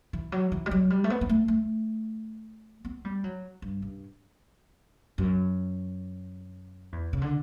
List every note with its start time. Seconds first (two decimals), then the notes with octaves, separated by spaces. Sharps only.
0.13 E3
0.32 F#3
0.52 E3
0.66 G3
0.71 F#3
0.90 G3
1.04 A3
1.10 B3
1.21 B3
1.29 A3
1.48 A3
2.85 B3
3.05 G3
3.24 F#3
3.62 G2
3.82 G2
5.18 F#2
6.92 E2
7.13 C#3
7.22 D3